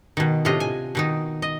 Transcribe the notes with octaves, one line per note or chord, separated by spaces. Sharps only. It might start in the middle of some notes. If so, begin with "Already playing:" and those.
B2 D#3
A2 C3 D4 F4 D#5
G#5
B2 D#3 D#4
D#5